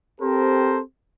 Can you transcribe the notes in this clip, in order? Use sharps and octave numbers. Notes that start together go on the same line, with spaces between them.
C4 G4 A4 A#4 C5